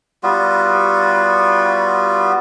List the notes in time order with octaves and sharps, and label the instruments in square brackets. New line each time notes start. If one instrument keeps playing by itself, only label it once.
[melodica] G3 B3 F4 F#4